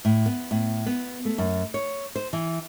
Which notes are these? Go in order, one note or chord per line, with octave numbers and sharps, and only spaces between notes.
A2
B3
A2
B3
A3
F#2
C#5
C5
E3